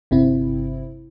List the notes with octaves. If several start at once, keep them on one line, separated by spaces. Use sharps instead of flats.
G1 C3 C4 E4